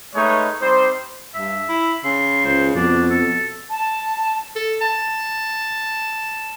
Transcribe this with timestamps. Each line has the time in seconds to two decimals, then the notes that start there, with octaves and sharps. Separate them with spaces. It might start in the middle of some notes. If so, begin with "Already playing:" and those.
0.15 G#3 A3 D#4 B4 C#5 C#6
0.61 G3 C4 D#4 C5
1.35 G2 E5
1.69 E4
2.04 C#3 C6
2.45 C#2 C5
2.75 F2 B2 D4
3.10 A4
3.70 A5
4.55 A4
4.81 A5